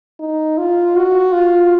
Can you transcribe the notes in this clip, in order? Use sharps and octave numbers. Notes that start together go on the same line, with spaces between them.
D#4
F4
F#4
F4